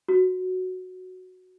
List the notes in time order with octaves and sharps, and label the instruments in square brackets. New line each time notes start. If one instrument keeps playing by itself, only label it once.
[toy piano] F#4